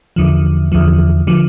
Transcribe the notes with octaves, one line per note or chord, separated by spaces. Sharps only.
E2 D3 F3
E2 D3 F3
D3 F3